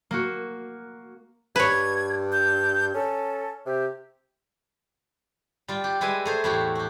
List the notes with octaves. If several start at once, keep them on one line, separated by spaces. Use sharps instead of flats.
A#3 F#4
G2 B4 C#5 G#6
G6
C#4 A4
C3 G4
G3 F4
G4
G3 G#3 B4 E5 G#5
A3 G#4 C5
E2 A2 E4 F#4 G4
F#4 G4